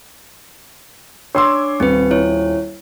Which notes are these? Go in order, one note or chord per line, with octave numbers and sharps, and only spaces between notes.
D4 C#5 C6 D6 E6
D#1 C4 B4
E4 C#5